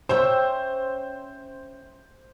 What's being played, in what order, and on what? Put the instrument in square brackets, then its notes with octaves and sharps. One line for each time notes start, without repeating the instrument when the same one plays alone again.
[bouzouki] C#4 E5 G5 [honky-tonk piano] C5